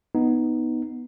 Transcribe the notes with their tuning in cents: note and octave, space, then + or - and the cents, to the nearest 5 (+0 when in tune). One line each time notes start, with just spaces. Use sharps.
B3 +0 D#4 +0